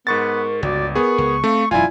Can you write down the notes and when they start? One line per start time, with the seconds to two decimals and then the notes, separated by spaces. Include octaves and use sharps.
0.07 G#2 B3 A#4 C#6 A6
0.63 G1 C#2 F#4 D5
0.95 B3 G#4 A#4 C#6
1.18 C#2
1.44 A3 C4 F5
1.71 E1 F#2 E4 F4 D5 G#5